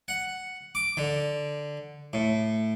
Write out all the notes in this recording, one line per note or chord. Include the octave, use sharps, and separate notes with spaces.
F#5
D6
D3
A2